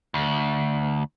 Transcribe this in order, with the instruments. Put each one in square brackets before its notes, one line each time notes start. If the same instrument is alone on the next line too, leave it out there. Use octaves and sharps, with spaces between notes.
[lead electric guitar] D2